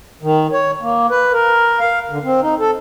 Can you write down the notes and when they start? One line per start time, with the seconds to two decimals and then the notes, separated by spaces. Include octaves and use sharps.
0.23 D#3
0.53 C#5
0.81 A#3
1.10 B4
1.32 A#4
1.80 F5
2.10 D3
2.24 C4
2.42 D#4
2.59 A4